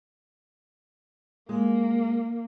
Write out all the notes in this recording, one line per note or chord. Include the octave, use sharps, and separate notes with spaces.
G#3 A#3